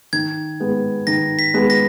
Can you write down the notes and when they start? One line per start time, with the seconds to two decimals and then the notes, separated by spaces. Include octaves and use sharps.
0.13 D#3 G#6
0.60 G#3 B3
1.07 D#3 A#6
1.39 B6
1.54 G#3 B3
1.70 A#6